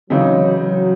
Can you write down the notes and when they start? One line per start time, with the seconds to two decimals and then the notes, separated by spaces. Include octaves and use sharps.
0.10 C#3 E3 F#3 G#3 C4 D#4
0.58 F#3